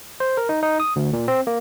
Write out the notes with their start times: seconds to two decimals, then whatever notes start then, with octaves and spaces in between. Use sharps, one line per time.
0.20 C5
0.37 A#4
0.49 D#4
0.63 D#4
0.80 D#6
0.96 D2
1.13 A#2
1.28 C4
1.47 A#3